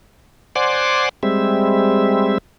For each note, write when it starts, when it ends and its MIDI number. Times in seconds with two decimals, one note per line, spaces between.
0.56 1.09 72
0.56 1.09 74
0.56 1.09 78
0.56 1.09 80
0.56 1.09 84
0.56 1.09 86
1.23 2.38 55
1.23 2.38 56
1.23 2.38 60
1.23 2.38 76